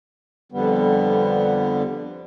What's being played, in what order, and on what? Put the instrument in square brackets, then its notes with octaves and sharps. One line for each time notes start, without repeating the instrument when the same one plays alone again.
[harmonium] F2 D3 G3 B3